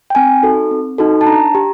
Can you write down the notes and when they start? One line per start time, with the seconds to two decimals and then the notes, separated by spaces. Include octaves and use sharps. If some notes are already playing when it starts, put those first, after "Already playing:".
0.10 G5
0.15 C4 G#5
0.43 D#4 F#4 A4
0.71 C4
0.98 D#4 F#4 A4
1.21 A5
1.26 D4 A#5
1.55 G4